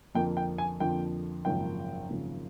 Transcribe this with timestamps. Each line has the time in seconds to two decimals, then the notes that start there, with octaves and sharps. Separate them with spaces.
0.15 F2 D3 F3 A#3 G5
0.37 G5
0.58 G#5
0.80 F2 D3 F3 A#3 G5
1.45 G#1 F#2 C#3 F3 A#3 G5
2.10 G#1 F#2 C#3 F3 A#3